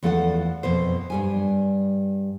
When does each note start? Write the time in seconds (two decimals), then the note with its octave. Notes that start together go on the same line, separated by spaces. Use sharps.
0.03 E2 F3 A3 A4 F5 F#5
0.63 F2 B2 C5
1.10 G2 G3 G#5